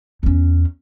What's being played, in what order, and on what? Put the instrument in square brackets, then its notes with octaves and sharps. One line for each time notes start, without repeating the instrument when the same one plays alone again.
[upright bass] E2 C#4